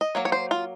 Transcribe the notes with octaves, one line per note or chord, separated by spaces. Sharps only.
D#5
F#3 A#3 C#5
C#5
C5
F4